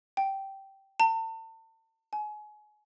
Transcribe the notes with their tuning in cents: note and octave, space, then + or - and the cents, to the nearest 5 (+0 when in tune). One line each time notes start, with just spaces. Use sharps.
G5 -10
A5 +40
G#5 +30